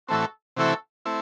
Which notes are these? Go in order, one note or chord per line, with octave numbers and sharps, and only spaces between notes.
A2 E3 A3 C4 F#4 A4
C3 E3 A3 C4 E4 F#4 A4
A3 C4 E4